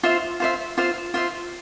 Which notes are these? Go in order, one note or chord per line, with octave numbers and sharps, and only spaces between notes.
F4 C5 E5
F4 C5 E5
F4 C5 E5
F4 C5 E5